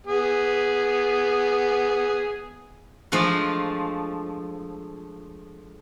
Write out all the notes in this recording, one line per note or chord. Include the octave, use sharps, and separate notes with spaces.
B3 G#4
F3 G#3 A3 D4 F4